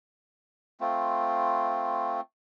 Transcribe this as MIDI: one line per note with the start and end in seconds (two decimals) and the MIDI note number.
0.81 2.21 57
0.81 2.21 60
0.81 2.21 65